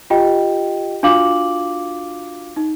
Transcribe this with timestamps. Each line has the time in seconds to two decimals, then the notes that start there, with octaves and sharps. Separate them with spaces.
0.10 F4 G4 D#5 G5
1.03 D4 F4 F#4 F5 D6 F#7
2.56 D#4